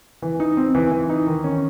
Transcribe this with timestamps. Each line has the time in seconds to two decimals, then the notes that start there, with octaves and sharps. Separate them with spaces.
0.22 E3
0.40 D#4
0.57 C4
0.75 E3
0.92 E3
1.09 D#4
1.27 D#3
1.44 C#4